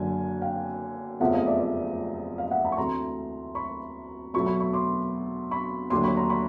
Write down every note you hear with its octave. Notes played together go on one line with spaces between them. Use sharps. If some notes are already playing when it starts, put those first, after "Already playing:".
Already playing: F#1 F#2 D3 G#5
F5 G5
F1 E2 C#3 F3 A3 E5 F#5
D#5 F5
D5 E5
D5 E5
D#5 F5
E5 F#5
A5 B5
C#6
D2 C3 E3 A3 A#5 C6
B5 C#6
E2 B2 F#3 A3 B5 C#6
B5 C#6
B5 C#6
C6 D6
B5 C#6
D#2 D3 F#3 A3 C6 D6
B5 C#6
A#5 C6
B5 C#6